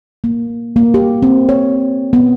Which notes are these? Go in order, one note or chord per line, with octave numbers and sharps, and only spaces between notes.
A#3
A#3
G4
C4
C#5
B3